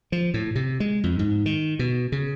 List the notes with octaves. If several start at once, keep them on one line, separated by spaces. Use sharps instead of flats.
F3
A2
C3
G#3
F2
G#2
D#3
B2
C#3